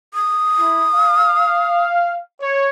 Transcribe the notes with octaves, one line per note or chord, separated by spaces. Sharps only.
D#6
E4
F5
C#5